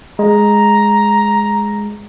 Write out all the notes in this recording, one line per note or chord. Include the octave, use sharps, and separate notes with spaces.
G#3 A#5